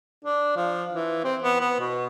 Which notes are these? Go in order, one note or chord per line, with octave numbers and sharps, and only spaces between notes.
D4
F3
E3
C4
B3
B3
B2